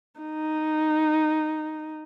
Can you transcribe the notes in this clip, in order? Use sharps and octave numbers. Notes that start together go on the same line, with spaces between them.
D#4